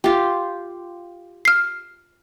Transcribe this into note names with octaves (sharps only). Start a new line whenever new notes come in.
F4 G4
F6 C7